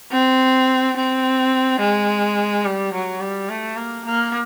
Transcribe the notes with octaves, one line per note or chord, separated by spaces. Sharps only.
C4
C4
G#3
G3
F#3
G3
A3
A#3
A#3